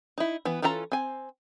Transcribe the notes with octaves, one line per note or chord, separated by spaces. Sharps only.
D#4 E4
E3 B3
E3 C#4 F4 A4 A#5
C4 G#5